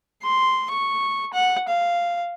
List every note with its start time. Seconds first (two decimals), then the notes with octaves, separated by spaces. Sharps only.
0.22 C6
0.70 C#6
1.33 F#5
1.68 F5